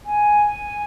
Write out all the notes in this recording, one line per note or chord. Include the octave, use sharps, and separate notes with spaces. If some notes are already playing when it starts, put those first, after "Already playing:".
G#5